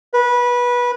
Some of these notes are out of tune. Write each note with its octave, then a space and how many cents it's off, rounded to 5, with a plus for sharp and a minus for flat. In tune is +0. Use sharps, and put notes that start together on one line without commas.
B4 -20